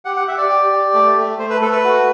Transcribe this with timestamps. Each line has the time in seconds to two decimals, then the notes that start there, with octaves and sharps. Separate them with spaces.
0.05 G4 F#5
0.17 F#5
0.28 G4 E5
0.38 D5
0.49 G4
0.72 G4
0.94 A3
1.17 A3
1.39 A3 C5
1.50 B4
1.61 A3 A4
1.72 B4
1.84 F#4